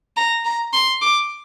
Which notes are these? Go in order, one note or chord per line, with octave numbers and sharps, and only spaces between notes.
A#5
A#5
C6
D6